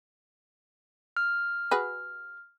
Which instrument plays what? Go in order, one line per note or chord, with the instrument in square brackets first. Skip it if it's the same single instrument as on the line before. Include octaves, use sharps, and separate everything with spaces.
[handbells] F6
[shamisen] F#4 G#4 B4